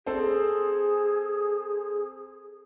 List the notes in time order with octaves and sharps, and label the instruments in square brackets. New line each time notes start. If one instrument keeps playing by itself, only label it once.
[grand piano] C4 A4 C5 [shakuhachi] G#4